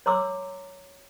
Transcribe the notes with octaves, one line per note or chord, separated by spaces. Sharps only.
C#5 A#5 C6 D6 E6